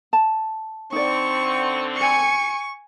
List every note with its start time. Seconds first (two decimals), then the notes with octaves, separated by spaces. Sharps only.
0.13 A5
0.93 D3 C4 D#4 D5 C#6
1.96 G#5 C#6 C#7